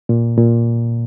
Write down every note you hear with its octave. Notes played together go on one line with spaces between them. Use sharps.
A#2
A#2